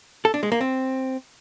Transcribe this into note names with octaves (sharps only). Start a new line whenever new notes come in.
A4
D4
G#3
A#3
C4